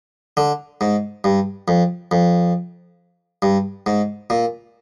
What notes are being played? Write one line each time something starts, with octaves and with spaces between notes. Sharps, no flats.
D3
G#2
G2
F2
F2
G2
G#2
A#2